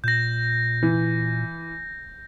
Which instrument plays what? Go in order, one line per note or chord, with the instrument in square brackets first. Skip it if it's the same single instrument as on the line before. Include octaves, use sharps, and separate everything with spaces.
[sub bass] A#2 [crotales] G6 A#6
[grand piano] E3